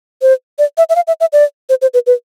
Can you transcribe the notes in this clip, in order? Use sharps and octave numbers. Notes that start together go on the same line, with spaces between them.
C5
D5
E5
E5
F5
E5
E5
D5
C5
C5
B4
B4